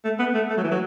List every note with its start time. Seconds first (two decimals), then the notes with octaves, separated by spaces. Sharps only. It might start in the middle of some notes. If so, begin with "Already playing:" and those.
0.05 A3
0.19 B3
0.35 A3
0.50 A3
0.57 F#3
0.64 E3
0.71 F#3